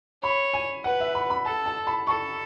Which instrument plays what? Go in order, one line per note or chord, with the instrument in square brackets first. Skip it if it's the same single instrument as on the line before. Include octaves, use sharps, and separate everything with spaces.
[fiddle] C#5 [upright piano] B5
[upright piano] G#5
[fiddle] B4 [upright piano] F#5
[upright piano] E5
B5
B5
[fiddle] A4 [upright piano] A5
[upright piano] A5
B5
[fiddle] A4 [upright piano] C#6